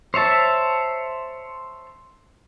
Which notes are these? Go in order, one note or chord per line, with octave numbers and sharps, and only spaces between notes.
C5 C#5 E5 A5